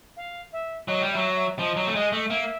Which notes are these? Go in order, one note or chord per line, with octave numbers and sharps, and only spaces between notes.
F5
E5
F#3 D#5
G3
F#3 E5
E5
F3 D#5
F#3
A3
G#3 D#5
A3
A#3 E5